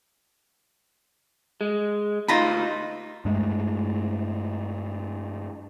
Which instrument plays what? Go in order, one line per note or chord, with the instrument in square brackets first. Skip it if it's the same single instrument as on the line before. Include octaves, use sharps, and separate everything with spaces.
[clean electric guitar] G#3
[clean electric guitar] D2 D#4 [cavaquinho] F4 A#5 B5
[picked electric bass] G2 G#3 A3